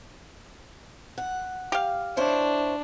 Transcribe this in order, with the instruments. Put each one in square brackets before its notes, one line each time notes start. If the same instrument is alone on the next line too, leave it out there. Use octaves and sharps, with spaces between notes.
[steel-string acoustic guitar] F#5
[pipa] G4 F5
[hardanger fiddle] D4 [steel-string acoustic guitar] E4 C5 C#5